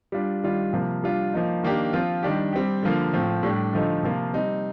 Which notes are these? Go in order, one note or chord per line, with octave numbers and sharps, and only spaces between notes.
G3 D4 F4
D#3 G3 D4 F4
C3 F3 A#3
G3 D4 F4
F3 A#3 D#4
D#3 A#3 D4 G4
F3 C4 F4
D#3 G3 D4 G4
G3 C4 G4
D3 F3 A#3
A2 F3 C4
A2 G3 D4 G4
D3 F3 A3 D#4
C3 F3 A#3 F4
G3 C4 D#4